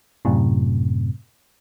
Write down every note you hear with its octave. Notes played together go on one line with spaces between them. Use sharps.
F#2 A2 C3